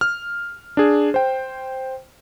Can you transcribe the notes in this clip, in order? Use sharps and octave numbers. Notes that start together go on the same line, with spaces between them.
F6
D4 G#4
C5 G5